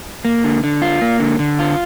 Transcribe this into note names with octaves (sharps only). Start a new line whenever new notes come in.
A#3
D3
D3
F4
A#3
D3
D3
F4